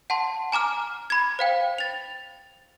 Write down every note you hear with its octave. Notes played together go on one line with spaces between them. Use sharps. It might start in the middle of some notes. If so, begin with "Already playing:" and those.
F#5 A5 C6
G#5 A#5 D6 F6
B5 G#6
C5 F5 G5
A6 F7